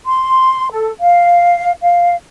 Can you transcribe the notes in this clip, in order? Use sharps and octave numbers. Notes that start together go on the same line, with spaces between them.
C6
A4
F5
F5